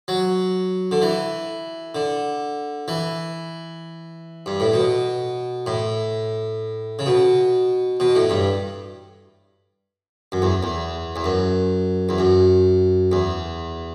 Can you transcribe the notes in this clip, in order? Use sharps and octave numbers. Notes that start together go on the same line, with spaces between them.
F#3
D3
E3
D3
E3
G2
A2
B2
A2
C#3
B2
B2
A2
G2
F#2
E2
E2
E2
F#2
E2
F#2
E2